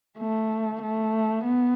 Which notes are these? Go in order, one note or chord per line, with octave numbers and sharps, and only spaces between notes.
A3
A3
B3